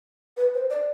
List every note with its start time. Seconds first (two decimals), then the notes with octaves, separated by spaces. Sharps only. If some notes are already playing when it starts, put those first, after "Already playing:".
0.37 B4
0.54 C5
0.70 D5